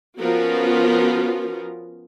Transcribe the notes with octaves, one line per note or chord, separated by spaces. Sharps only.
F3 B3 C#4 F4 F#4 A#4